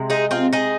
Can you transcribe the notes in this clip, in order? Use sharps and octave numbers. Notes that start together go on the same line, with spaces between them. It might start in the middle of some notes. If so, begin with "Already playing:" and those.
Already playing: C3 G#3
D#4 G#4
C4 F4
D#4 G#4